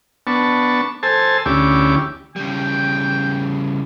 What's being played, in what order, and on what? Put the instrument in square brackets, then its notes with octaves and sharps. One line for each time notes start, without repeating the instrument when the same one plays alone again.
[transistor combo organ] B3 D4 A5 C#6
A4 C5 G#5 A5
D2 C#4 E4 G4 D6
[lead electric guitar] C#3 G3 [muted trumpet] G5